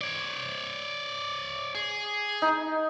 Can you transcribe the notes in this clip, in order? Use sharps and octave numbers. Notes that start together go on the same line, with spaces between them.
C#5 D5
G#4
D#4